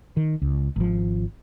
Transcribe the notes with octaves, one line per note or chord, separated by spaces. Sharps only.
D#3
C#2
G#1 F3